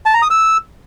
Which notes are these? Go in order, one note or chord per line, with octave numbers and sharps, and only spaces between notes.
A5
A#5
D#6
E6